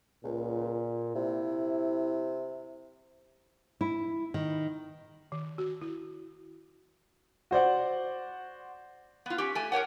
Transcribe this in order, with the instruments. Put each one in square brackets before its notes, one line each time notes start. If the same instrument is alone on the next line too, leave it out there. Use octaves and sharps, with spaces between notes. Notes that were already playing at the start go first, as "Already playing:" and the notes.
[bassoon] C#2 [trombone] A#2
[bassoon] C3 [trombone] E4
[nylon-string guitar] E4
D#3
[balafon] D#3
F#4
E4
[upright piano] F#4 C5 D5 F#5
[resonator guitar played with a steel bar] B3 F4
C#4 G4
A3 G#5
A#4 C5 C#5 F#5